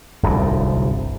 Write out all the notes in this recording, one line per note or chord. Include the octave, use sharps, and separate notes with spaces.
D1 G1 C2 G#2